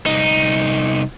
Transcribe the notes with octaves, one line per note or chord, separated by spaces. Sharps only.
C2 D#4